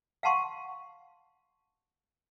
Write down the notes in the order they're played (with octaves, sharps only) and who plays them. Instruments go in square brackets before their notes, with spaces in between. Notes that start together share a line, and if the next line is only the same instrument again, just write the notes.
[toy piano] F5 F#5 A5 C6 C#6